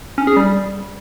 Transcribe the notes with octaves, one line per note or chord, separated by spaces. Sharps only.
C#4
G#4
G3